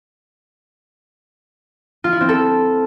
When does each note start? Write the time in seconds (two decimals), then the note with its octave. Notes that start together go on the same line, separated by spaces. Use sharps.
2.04 F4
2.12 E4
2.21 C4
2.29 A4